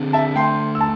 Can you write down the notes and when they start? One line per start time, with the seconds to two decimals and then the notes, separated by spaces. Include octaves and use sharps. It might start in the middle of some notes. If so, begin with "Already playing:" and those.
Already playing: D3 C4
0.13 E5 A5
0.36 A3 G5 C6
0.75 E6
0.81 A5